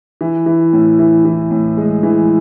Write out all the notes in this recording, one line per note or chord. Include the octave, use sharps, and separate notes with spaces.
E3
E3
A2
E3
E3
A2
G#3
E3